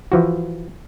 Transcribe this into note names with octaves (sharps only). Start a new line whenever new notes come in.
E3 F3 F#4